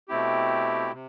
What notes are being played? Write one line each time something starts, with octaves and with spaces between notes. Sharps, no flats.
B2 A3 C4 E4 G4
C3